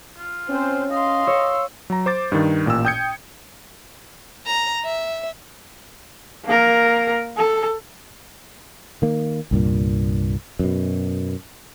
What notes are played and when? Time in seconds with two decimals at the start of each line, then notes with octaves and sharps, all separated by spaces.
0.17 F4
0.49 C4 C#4 C5
0.91 D#5 F5 C6
1.27 C#5 E6
1.90 F#3 A#5
2.06 C5 D6 A6
2.32 G2 D#3
2.66 A1 A#2 G5 E6
2.85 G5 D#6 G6 G#6 C#7
4.47 A#5
4.85 E5
6.45 A#3 A#4
7.37 A4
9.02 D#3 A#3
9.51 C2 G2 A#2
10.59 F#2 B2